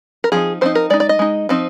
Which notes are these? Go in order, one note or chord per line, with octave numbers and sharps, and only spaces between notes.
A#4
F3 C4 D#4 G#4
F3 C4 D#4 C5
A#4
G#3 D#4 D5
D5
D#5
G#3 D#4
F3 C4 D#4